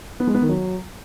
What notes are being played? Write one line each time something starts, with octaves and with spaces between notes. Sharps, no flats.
B3
G#3
B3
D#3
F#3